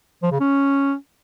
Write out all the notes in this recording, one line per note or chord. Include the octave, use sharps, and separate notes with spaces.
F3
C#3
C#4